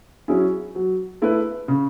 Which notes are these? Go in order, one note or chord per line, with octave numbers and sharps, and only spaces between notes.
F#3 C#4 E4 G#4
F#3
A3 E4 B4
C#3